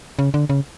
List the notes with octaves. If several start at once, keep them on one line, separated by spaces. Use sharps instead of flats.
C#3
D3
C#3